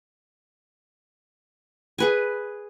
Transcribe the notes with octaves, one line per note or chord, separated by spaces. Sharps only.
G#4 B4 G#5